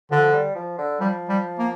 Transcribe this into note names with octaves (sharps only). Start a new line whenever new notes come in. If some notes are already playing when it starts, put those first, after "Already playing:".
D3 F3
G3
F3
D3
F3 G3
G3
A#3